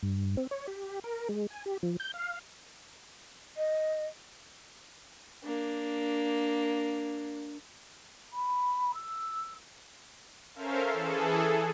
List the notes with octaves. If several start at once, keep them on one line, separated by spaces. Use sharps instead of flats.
G2
C4
C#5
G4
A#4
G#3
G#5
G4
F3
G6
F5
D#5
A#3 D4
B5
E6
C#4 A4 A#4 C5 E5 F5
E3 G#4 A4